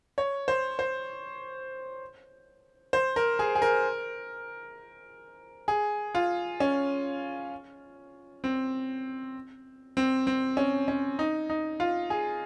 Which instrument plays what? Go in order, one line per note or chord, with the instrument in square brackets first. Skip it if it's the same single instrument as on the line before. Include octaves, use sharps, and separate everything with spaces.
[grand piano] C#5
C5
C5
C5
A#4
G#4
G#4
A#4
G#4
F4
C#4
C4
C4
C4
C#4
C#4
D#4
D#4
F4
G#4